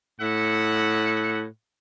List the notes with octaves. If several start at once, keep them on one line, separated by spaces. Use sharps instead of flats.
A2 E5 F#5